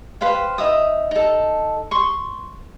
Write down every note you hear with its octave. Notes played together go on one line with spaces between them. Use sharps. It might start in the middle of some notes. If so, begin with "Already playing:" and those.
B4 C5 F5 G5
D#4 E5 D#6
D#4 A4
C6 C#6